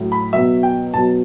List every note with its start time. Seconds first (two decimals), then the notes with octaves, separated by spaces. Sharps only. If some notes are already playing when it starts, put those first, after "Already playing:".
Already playing: A2 F#3
0.12 B5
0.32 B2 F#3 E5
0.63 G5
0.94 B2 F#3 A5